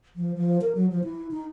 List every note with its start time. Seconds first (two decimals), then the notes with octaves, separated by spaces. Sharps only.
0.16 F3
0.35 F3
0.61 A#4
0.75 F#3
0.91 F3
1.04 E4
1.31 D#4